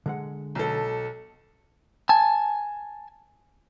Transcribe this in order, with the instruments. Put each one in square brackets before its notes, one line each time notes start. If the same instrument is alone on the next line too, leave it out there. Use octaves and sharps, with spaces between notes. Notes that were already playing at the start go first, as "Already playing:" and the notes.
[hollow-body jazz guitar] D3 G#3 F#5
[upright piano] B1 A4
[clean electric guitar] G#5 A5